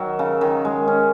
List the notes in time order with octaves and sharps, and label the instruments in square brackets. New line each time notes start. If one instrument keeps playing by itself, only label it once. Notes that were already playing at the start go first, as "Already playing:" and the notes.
Already playing: [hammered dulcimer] D#3 F#3
C#3
D#3
G#3
C#4